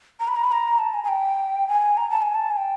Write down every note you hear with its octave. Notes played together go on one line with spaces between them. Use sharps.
A#5
B5
A#5
B5
A#5
A5
G#5
G#5
G5
G#5
A#5
A5
G#5
A5
G#5
G5